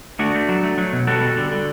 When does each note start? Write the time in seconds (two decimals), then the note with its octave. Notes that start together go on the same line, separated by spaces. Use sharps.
0.19 A3 D4 F#4
0.35 A3
0.49 F#3
0.64 A3
0.78 F#3
0.93 B2
1.07 G3 F#4 A4
1.22 G3
1.37 D3
1.51 D3